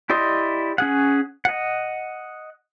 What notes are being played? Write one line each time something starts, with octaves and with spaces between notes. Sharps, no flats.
E4 G4 D5 D#5 C6
C#4 G#4 F#5
D#5 F#5